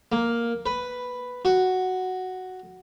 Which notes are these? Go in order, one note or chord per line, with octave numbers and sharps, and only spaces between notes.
A#3
B4
F#4